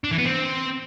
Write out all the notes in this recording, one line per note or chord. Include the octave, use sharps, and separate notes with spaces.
D4
E3
B3
C4